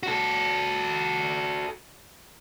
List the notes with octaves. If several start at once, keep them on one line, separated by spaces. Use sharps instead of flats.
F#4 A4